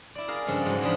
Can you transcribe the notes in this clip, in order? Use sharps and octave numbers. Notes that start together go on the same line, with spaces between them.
E4 D5
G#4 A#4 F5
G2 C#3 F3 G#3 A4
G#2 F#3 G#3
E2 C#3 F3 D4 G#4 B5